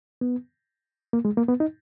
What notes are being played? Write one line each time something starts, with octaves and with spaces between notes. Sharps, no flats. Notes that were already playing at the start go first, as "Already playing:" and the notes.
B3
A#3
G#3
A#3
B3
D#4